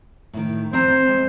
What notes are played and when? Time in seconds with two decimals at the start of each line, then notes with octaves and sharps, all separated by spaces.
0.33 A2 D#3
0.73 C4 C5 A#5
1.08 G#3